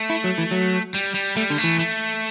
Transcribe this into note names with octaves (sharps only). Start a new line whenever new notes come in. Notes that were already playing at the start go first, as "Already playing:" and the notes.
Already playing: A3
E4
F#3
E3
F#3
G3
G3
G3 A3
D3
A3
E3
A3